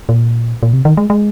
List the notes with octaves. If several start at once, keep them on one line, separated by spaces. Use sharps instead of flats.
A#2
A#2
C3
D#3
G#3
G#3